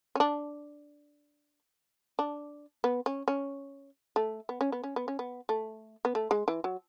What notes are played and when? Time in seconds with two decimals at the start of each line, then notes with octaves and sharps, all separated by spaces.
0.15 C#4
0.20 D4
2.19 D4
2.84 B3
3.06 C#4
3.28 C#4
4.16 A3
4.49 B3
4.61 C#4
4.72 B3
4.84 C#4
4.96 B3
5.08 C#4
5.19 B3
5.49 A3
6.05 B3
6.15 A3
6.31 G#3
6.48 E3
6.64 F#3